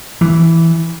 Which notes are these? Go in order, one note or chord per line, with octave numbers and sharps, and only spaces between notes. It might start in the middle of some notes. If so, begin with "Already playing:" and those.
E3